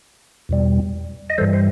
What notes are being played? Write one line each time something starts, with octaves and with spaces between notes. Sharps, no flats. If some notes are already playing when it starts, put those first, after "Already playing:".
E2 B2 G3
D#5
G2 E3 G3 A4 C5
C5